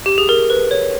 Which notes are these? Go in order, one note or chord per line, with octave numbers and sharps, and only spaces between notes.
G4
G#4
A#4
B4
C#5